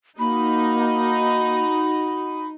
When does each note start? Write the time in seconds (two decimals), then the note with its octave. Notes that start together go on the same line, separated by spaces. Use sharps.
0.19 A#3 D#4 F#4 B5